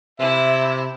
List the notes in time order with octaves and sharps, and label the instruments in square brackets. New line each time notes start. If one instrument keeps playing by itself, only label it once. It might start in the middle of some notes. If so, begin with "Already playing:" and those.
[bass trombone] C3 [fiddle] E4 [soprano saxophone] E5